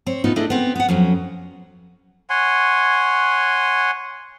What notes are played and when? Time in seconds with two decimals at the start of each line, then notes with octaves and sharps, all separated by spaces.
0.06 C4 C#5
0.24 A2 C3 B3 D#4 F4
0.36 A3 D4 E4 G#4 D#5
0.50 B3 C4
0.76 B3 F#5
0.89 F2 F#3 C#4
2.30 C#5 F#5 G#5 C6